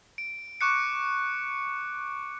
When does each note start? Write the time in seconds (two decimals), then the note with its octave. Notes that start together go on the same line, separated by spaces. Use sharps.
0.18 D7
0.61 C#6 D6 F#6 C#7